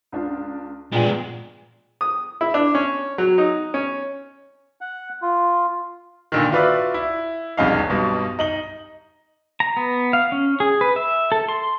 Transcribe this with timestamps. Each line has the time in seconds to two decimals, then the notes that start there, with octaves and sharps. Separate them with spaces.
0.12 C#2 D4 F4
0.92 G2 A#2 G#3 B3 G5 D#7
2.01 D#6
2.41 E4
2.54 D4
2.75 C#4
3.18 F#3
3.38 D#4
3.74 C#4
4.81 F#5
5.22 F4
6.32 A#2 D3 D#3
6.52 F4 F#4 B4 D5 E5
6.94 E4
7.57 E1 C2 F2 C#4 D#4 F5
7.90 B1 G2 B2
8.39 D#4 F#7 G7
9.60 A#5
9.77 B3
10.13 F5
10.32 C#4
10.60 G#4
10.81 B4
10.96 E5
11.32 A4
11.49 C6